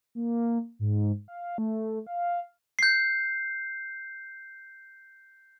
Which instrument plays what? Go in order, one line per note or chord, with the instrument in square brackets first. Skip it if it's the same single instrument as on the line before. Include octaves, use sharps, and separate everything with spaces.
[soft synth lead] A#3
G#2
F5
A3
F5
[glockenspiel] G6 C7